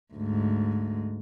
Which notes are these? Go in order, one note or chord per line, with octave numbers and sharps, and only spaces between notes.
D2 G#2